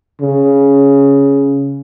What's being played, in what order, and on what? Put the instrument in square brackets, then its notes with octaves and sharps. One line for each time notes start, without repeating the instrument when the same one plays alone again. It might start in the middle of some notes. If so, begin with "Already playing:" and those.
[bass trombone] C#3